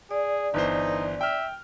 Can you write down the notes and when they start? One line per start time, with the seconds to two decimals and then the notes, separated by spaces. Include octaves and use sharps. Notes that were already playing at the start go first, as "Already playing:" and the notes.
0.11 G#4 D5
0.54 G1 E3 D#4 C5
1.21 E5 G5 F6